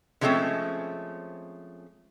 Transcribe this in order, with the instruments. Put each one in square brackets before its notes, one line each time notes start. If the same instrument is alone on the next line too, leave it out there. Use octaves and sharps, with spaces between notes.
[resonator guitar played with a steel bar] D3 F3 G#3 A3 C4 C#4